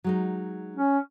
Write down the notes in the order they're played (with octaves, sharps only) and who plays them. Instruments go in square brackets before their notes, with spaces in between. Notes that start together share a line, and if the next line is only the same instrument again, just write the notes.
[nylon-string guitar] F#3 G#3 D#4
[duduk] C#4